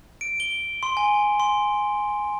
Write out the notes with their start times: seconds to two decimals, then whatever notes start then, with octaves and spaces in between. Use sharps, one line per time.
0.21 D7
0.40 G7
0.83 C6
0.97 G#5
1.40 C6